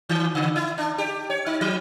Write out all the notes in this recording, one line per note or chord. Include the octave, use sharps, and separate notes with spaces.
D#3
C#3
E4
D4
G4
C#5
D#4
F3